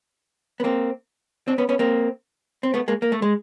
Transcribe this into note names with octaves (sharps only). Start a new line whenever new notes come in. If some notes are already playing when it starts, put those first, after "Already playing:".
B3
A#3 C4
C4 D4
B3 C#4
B3 C#4
A#3 C4
C4
A3 B3
G#3 A#3
A#3
A3
G#3